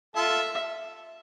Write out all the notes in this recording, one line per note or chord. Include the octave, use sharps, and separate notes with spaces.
F4 A4 E5